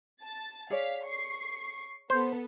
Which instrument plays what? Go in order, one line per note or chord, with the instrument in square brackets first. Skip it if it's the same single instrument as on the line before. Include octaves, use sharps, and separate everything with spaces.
[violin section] A5 A6
[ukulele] G#4 C#5 D5 [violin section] F5 B6
[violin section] C#6 C7
[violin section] B3 A4 [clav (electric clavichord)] C5